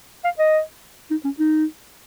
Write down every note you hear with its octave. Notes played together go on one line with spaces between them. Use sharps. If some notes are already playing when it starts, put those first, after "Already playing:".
F5
D#5
D#4
C#4
D#4